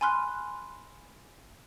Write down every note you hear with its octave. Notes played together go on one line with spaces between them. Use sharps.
G#5 B5 C6 F6 F#6